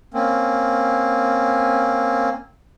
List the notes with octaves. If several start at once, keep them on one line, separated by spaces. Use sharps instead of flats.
A#3 C4 C#4